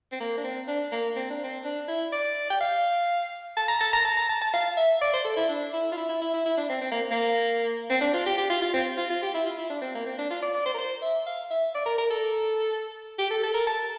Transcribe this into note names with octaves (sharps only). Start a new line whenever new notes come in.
C4
A#3
D4
C4
D4
A#3
C4
D4
C4
D4
E4
D5
G5
F5
A5
A#5
A5
A#5
A5
A#5
A5
A5
F5
E5
D5
C5
A4
E4
D4
E4
F4
E4
E4
E4
E4
E4
D4
C4
C4
A#3
A#3
C4
D4
F4
G4
G4
F4
F4
C4
F4
F4
G4
E4
F4
E4
D4
C4
A#3
C4
D4
F4
D5
D5
C5
A#4
C5
E5
F5
E5
D5
A#4
A#4
A4
G4
A4
A4
A#4
A5